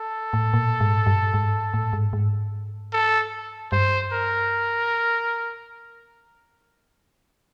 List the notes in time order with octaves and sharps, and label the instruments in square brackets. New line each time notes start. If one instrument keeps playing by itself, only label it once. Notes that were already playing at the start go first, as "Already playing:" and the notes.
Already playing: [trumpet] A4
[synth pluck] A2
A#2
G#2
G2
G#2
A2
G#2
G#2
[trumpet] A4
[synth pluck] G2 [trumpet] C5
[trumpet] A#4